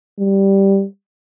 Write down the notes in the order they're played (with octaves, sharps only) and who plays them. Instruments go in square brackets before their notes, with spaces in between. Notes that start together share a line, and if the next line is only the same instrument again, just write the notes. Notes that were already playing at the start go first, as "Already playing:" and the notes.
[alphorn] G3